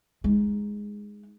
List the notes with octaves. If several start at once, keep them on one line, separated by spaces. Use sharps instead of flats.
G#3 D#4